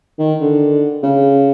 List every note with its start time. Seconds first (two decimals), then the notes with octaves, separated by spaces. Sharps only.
0.19 D#3
0.40 D3
1.03 C#3